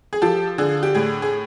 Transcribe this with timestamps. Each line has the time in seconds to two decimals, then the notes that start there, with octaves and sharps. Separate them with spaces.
0.13 G#4
0.22 F3 G4 A4
0.58 D3 G#4
0.83 G4
0.95 A2 G#4
1.22 G#4